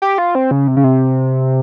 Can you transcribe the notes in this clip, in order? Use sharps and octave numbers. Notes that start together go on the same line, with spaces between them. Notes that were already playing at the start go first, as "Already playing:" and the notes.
G4
F4
C4
C#3
C3
C#3
C3